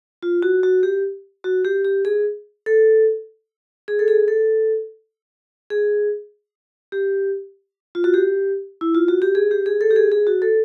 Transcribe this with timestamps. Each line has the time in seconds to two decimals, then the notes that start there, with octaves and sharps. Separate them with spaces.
0.23 F4
0.43 F#4
0.63 F#4
0.83 G4
1.44 F#4
1.65 G4
1.85 G4
2.05 G#4
2.66 A4
3.88 G#4
3.99 A4
4.08 G#4
4.28 A4
5.70 G#4
6.92 G4
7.95 F4
8.04 F#4
8.14 G4
8.81 E4
8.95 F4
9.08 F#4
9.22 G4
9.35 G#4
9.51 G4
9.66 G#4
9.81 A4
9.91 G4
9.96 G#4
10.12 G#4
10.27 F#4
10.42 A4